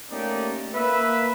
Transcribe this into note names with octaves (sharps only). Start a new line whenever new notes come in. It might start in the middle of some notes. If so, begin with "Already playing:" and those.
A3 A#3 C#4 D#4 G4 D5
A#3 B4 E5